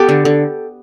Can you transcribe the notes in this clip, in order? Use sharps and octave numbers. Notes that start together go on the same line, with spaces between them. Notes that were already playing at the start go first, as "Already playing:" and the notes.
Already playing: B3 G4 A4
D3
D3